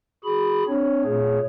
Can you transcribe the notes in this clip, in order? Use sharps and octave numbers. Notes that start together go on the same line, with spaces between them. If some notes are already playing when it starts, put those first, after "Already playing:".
F#4 G#4 B5
C4 D4 C#5
A#2 A3 G#4 C#5